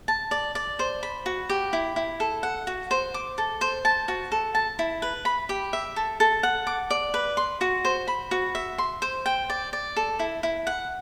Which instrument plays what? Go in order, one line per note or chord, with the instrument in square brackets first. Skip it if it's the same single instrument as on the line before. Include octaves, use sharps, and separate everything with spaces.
[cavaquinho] A5
D5
D5
C5
B5
F#4
G4
E4
E4
A4
F#5
F#4
C5
D6
A4
C5
A5
F#4
A4
A5
E4
B4
B5
G4
E5
A4
A4
F#5
D6
D5
B4
C6
F#4
C5
B5
F#4
E5
C6
C5
G5
D5
D5
A4
E4
E4
F#5